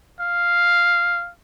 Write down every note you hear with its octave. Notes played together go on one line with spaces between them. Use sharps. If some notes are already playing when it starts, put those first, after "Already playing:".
F5